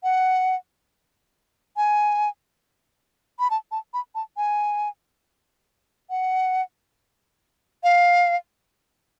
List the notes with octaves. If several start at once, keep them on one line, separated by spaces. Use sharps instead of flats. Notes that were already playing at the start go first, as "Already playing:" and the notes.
F#5
G#5
B5
A5
A5
B5
A5
G#5
F#5
F5